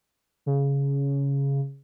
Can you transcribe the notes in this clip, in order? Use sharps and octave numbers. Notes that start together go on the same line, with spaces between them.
C#3